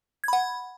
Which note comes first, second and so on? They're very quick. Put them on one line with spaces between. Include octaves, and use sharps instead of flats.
G#6 B5 F#5